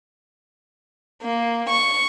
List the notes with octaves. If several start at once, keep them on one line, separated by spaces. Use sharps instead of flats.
A#3
C#6